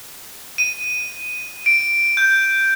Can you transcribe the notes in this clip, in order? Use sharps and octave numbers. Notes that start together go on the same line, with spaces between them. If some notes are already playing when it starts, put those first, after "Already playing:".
D#7
D7
G6